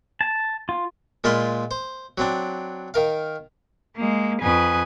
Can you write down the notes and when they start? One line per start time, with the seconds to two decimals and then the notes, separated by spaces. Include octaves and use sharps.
0.21 A5
0.69 F4
1.24 A#2 G#3 A#3 F4 B5 C6
1.71 C5
2.18 F#3 C4 D4
2.94 D#3 A#4 F5
3.96 G#3 A#3
4.42 F2 B4 G#5 D#6 F#6